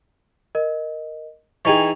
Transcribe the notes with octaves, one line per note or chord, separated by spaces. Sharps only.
A#4 D#5
E3 D#4 G#4 G5 G#5 C#6